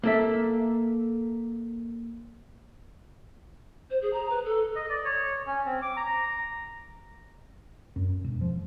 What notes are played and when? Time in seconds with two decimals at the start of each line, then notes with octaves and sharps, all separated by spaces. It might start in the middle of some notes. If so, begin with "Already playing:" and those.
0.03 A#3 A4 E5
3.90 C5
4.02 G#4
4.13 A#5
4.30 B4
4.45 A4
4.76 D#5
4.90 D5
5.05 C#5
5.47 C#4
5.66 C4
5.82 D6
5.97 A#5
7.96 F#2
8.24 E1
8.41 F3